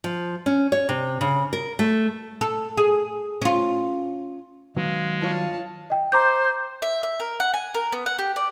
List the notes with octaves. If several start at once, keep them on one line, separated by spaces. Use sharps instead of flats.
F3
C#4
C#5
C3
C#3
A#4
A3
A4
G#4
C#4 F4
D#3 F#3 G#3 B3 F5
G2 F4 C#5 F5 A5
D#5 G5
C5 A#5 D6 G6
E5
E5
A#4
F#5
G#5
A#4
B3
F#5
G4
D5